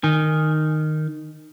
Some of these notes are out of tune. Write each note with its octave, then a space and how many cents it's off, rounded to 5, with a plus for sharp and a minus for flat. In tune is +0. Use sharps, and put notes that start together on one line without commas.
D#3 -10 G#5 -20